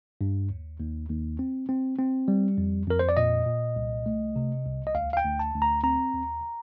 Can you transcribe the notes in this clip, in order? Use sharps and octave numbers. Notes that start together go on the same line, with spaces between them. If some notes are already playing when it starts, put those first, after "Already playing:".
G2
D#2
D#2
D#2
C4
C4
C4
G3
F2
F2 A#4
C5
D5
A#2 D#5
A#2
C2
A3
C3
C2
D#5
D2 F5
F5
G5
D2
A5
D2
A#5
C4 A#5
D#2